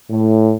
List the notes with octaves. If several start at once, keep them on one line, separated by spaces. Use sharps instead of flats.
A2